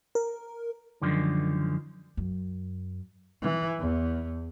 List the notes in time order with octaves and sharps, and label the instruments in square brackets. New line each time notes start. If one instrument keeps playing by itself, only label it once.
[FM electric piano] A#4
[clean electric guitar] F#2 D3 D#3 F3 G3 G#3
[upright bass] F#2
[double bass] E3
E2